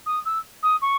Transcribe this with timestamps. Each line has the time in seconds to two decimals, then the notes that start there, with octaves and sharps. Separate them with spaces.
0.06 D#6
0.25 E6
0.63 D#6
0.82 C#6